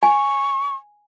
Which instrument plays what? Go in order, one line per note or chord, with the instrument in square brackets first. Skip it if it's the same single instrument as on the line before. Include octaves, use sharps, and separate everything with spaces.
[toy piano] G#5 [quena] C#6